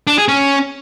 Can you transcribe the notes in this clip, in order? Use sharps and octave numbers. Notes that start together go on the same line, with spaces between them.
D4
G#4
C#4